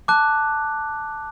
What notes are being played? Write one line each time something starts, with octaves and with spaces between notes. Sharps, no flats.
A5 D6 F#6